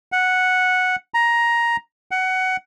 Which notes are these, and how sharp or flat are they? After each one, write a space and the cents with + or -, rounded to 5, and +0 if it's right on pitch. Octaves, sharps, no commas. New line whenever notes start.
F#5 -5
A#5 +10
F#5 +15